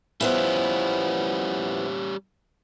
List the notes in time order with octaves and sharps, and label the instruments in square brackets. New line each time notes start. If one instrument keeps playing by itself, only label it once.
[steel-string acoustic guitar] F3 B3 E4 [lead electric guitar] G3 C#4